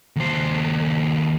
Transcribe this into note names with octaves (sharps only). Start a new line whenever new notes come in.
D#2 C5